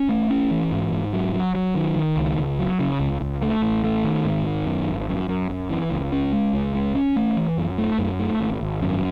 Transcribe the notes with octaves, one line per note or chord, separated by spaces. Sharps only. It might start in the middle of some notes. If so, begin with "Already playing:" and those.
Already playing: C#4
A3
C#4
E3
G#2
G#2
F#3
F#3
F#3
D#3
D#3
C#2
C#2
F#3
C#3
C#2
C#2
A3
A1
A3
D#3
G#2
D#3
F#2
G#1
F#2
F#2
F#2
E3
C#2
C#4
G#3
C#2
G#3
C#4
A3
E3
F#2
A3
F#2
A3
G#1
G#1
F#2